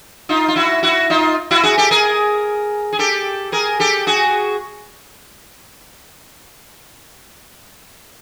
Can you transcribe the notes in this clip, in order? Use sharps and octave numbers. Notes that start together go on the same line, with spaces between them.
D#4 F4
F4
E4 F#4
E4 F#4
D#4 F4
E4 F#4
F#4 G#4
G4 A4
G#4 A#4
G#4
G4 A4
G#4 A#4
G4 A4
F#4 G#4